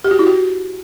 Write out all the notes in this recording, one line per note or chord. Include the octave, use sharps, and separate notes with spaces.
G4
F#4
E4
F#4